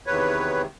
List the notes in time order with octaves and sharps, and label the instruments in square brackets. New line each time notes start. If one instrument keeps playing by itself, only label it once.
[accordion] E2 C3 D#3 B4 C#5